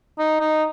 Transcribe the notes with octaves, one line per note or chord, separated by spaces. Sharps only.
D#4
D#4